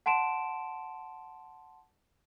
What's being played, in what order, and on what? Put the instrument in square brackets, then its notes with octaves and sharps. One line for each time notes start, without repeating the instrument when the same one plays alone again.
[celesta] F#5 A5 C6 D7 E7